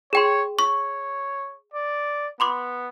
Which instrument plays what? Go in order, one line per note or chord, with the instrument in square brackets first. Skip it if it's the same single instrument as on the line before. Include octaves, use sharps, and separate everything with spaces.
[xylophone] G#4 G5 C6 [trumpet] C#5
[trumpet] C#5 [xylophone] C#6
[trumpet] D5
[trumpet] B3 [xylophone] B5 C6 D6